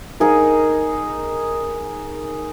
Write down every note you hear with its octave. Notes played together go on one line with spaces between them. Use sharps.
D#4 G#4 A#4